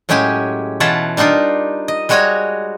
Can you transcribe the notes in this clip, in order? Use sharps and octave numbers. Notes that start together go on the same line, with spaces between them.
A2 F#3 G#3 C#4 G4 G#5
B2 E3 F4 C#5 F#5 A5
G3 D4 D#4 F4 A#4
D#5
G3 G#3 F#4 C#5 G#5 A#5